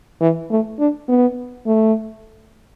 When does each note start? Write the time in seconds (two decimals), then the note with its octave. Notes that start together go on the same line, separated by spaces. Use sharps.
0.20 E3
0.50 A3
0.79 D4
1.08 B3
1.66 A3